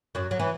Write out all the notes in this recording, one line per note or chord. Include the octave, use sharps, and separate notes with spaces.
F#2 F#3
F#3
E3